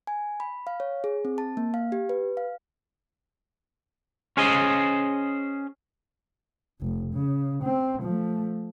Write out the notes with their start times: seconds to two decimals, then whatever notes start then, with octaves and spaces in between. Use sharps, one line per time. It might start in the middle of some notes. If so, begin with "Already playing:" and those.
0.07 G#5
0.40 B5
0.67 F5
0.80 C#5
1.04 G#4
1.25 C4
1.38 A5
1.57 A#3
1.74 F5
1.92 G4
2.09 B4
2.37 F5
4.37 C#4 G#4 C5 D#5
6.81 F1
7.14 C#3
7.63 C4
8.02 F3 A3